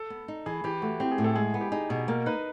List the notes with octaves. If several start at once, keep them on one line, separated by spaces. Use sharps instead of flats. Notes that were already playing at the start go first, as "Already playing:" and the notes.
Already playing: A4
B3
D#4
E3 G#4
E3 G4
A3 F#4
C4 G4
G#4
A2
A4
G#3 G#4
B3
G4
D#4 G#4
B2 G#4
A#3 A#4
D#4 B4